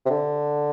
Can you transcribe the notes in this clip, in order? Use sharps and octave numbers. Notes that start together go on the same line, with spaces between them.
C3
D3